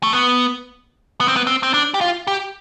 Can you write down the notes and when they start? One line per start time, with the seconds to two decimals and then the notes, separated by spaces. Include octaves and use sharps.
0.03 A3
0.13 B3
1.21 B3
1.28 C4
1.36 B3
1.47 C4
1.63 C4
1.74 D4
1.94 G4
2.01 F4
2.27 G4